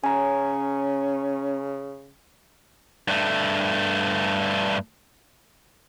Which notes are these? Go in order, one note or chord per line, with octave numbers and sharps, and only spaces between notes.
C#3 C#4 G#5 A#5
G2 A3